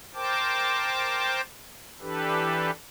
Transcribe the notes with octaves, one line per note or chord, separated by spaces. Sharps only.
A#4 C5 G5 A5 D6
E3 D4 G4 A4 B4